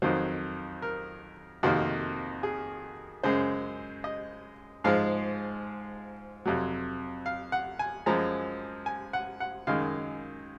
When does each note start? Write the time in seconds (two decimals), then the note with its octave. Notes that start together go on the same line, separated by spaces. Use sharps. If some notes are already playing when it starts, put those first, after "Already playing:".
0.02 F2 D#3 F#3 C5
0.82 A#4
1.63 F2 C3 D#3 A#3 F#4
2.43 G#4
3.23 F#2 C#3 G#3 C5
4.04 D#5
4.84 G#2 F3 G#3 F5
6.45 F2 C3 F#3
7.26 F5
7.52 F#5
7.79 G#5
8.06 F#2 F3 G#3 A#5
8.86 G#5
9.13 F#5
9.40 F#5
9.67 F#2 D#3 G#3 F5